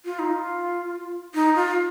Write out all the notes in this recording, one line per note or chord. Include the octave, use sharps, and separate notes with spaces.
F4
D#4
F4
D#4
F4